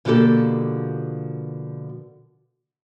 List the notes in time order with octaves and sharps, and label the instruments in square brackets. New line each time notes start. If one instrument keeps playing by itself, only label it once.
[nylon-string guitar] B2 D3 F3 A#3 G4 A4